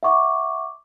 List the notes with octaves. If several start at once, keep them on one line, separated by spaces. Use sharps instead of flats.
E5 F#5 C#6 D6